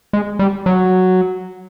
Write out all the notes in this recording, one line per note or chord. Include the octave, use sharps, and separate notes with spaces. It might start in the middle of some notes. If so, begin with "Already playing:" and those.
G#3
G3
F#3